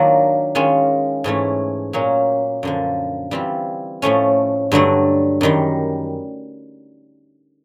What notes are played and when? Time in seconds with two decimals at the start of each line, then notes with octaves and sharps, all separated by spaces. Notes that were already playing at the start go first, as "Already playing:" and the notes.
Already playing: D#3 F#3 A#3 D4 F4
0.55 D#3 G#3 C#4 F4
1.24 G#2 E3 A3 C#4
1.93 A#2 F#3 A#3 C#4
2.63 F#2 D3 F3
3.31 E3 G3 C4 F4
4.02 A2 F3 A3 C#4
4.72 G2 D3 F#3 A3 D4
5.41 F#2 D#3 G3